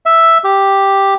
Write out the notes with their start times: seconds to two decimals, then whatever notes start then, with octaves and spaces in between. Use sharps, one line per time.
0.06 E5
0.44 G4